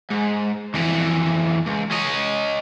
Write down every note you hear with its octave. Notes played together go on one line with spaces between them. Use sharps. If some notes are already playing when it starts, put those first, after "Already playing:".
G#2
F2 E3
C#2
C#4 D#5